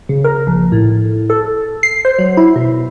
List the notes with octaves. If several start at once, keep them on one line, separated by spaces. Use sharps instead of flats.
C#3
A#4
A#1
A2
A4
C7
C5
F#3
E4
B2